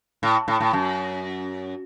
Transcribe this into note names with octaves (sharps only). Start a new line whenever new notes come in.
A2
A2
A2
F#2